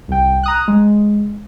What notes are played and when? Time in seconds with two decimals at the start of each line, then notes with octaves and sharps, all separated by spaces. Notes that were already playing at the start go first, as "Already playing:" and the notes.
0.08 C2 G5
0.43 A#5 D#6 F#6
0.68 G#3